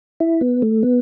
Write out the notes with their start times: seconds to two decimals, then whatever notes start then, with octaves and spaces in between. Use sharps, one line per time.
0.20 E4
0.41 B3
0.62 A3
0.83 B3